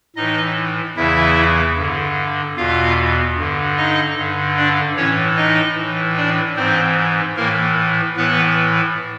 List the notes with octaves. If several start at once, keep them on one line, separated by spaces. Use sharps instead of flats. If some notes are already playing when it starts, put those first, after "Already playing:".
A2 E3 D#4 D#5
E2 C#3 E3 E4 E5
G2 D3
E2 B2 F4 F5
G2 D3
D#4 D#5
G2 D3
D4 D5
A2 E3 C#4 C#5
D#4 D#5
A2 E3
D4 D5
G#2 E3 C4 C5
A2 E3 A#3 A#4
A2 E3 B3 B4